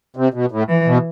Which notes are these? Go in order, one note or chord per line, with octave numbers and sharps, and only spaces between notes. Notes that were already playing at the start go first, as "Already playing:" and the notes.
C3
B2
A2
E3
B2